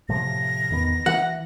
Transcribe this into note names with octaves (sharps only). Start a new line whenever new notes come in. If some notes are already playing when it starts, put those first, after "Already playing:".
A2 C3 F3 A#6
E2 D#3 B3
E3 F#5